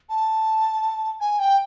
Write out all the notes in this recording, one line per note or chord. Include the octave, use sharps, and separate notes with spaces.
A5
G#5
G5